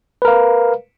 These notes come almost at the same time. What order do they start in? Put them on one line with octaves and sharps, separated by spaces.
B4 A#4 F5